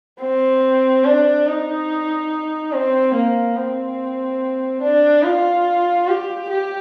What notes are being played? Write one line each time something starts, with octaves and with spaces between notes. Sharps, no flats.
C4
D4
D#4
C4
A#3
C4
D4
F4
G4
G4